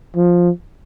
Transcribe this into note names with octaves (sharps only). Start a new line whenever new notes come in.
F3